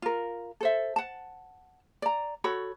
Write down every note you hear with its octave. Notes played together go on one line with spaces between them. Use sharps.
F4 A#4
A4 C5 E5
F#5 A5
D5 A#5
F#4 A4 C#5 B5